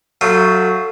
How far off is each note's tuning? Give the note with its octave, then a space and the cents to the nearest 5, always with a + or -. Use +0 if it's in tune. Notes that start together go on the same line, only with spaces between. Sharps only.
F#3 +0 A3 +20 F4 +0